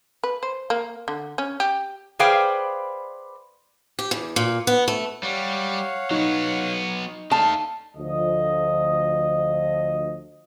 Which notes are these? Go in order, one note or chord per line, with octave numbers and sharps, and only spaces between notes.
B4
C5
A#3
D3
C#4
G4
G#4 B4 C5 D5 F5 G5
G4
E2
A#2
B3
A3
G3 C#5 F5 F#5
F#3 B3 D#4
A3 D#4 F5 A5
D2 F3 D#5